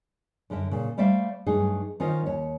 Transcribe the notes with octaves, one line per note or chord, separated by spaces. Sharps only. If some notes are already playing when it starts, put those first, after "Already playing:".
F#2 D3 A#4 E5
A#2 C#3
G3 A3 C5 D5 E5 F5
G2 F#3 A3 D#4 G#4
D#3 C#4 F4 C5 D#5
D#2 C#5